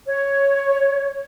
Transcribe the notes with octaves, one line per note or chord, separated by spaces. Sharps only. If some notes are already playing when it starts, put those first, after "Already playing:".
C#5